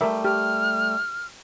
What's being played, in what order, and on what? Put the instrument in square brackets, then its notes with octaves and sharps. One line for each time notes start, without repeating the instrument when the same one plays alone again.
[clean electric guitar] G3 A3 [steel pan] A#4 E5
[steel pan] G4 [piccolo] F6